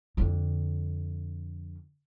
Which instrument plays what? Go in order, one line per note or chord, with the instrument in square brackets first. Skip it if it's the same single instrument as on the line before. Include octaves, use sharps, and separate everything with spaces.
[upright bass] F2 D3